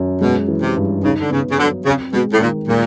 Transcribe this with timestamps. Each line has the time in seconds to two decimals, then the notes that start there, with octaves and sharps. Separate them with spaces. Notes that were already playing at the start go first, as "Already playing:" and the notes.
Already playing: F#2
0.21 B2 G#3
0.48 E3
0.62 C3
0.77 G2
1.03 C#3 D#4
1.20 D3
1.30 C#3 B3
1.51 C#3
1.58 D3 F#3
1.85 C#3 C4
2.13 B2 G#3
2.33 A2
2.40 A#2 D#3
2.68 A#2 G#3